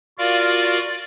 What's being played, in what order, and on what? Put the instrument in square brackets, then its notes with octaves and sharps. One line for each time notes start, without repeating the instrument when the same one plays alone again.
[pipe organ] F4 F#4 A#4 D5 F5